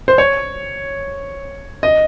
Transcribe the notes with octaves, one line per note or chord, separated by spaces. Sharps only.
C5
C#5
D#5